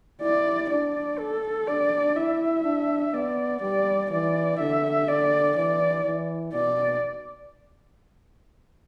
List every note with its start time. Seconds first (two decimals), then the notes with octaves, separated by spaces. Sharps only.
0.22 E4 D5
0.70 D4 D5
1.18 A4
1.67 D4 D5
2.16 E4 E5
2.65 D4
3.14 B3 D5
3.62 G3 D5
4.11 E3 D5
4.59 D3 E5
5.08 D3 D5
5.56 E3 D5
6.05 E3
6.54 B2 D5